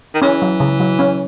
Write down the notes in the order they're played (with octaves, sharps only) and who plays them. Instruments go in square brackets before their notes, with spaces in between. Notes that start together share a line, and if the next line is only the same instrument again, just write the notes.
[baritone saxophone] D#3
[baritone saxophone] E3 [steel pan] C#4
[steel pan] F#3
C#3
F#3
C#4